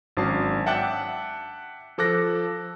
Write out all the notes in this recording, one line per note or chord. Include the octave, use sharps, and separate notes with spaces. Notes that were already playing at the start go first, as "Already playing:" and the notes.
G#1 F#3 C#4 D4 A5 C7
E5 F#5 G5 A5 D6 F#6
F3 A4 D6 F#6 A#6